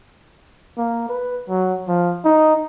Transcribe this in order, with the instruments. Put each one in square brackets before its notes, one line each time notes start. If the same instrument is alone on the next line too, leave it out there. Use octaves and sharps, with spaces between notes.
[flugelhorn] A#3
B4
F#3
F3
D#4